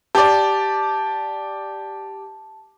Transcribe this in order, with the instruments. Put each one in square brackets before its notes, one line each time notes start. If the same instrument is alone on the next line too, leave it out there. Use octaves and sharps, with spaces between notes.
[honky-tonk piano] G4 D5 [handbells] A5